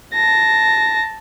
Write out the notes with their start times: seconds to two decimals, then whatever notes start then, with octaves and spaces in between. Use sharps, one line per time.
0.14 A5 A#6